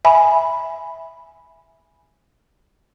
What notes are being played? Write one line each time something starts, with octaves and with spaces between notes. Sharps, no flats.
E5 G#5 B5